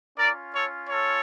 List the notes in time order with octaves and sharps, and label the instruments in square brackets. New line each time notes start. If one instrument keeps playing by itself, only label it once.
[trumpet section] C#4 F4 A#4 D5
A4 C#5
A4 C#5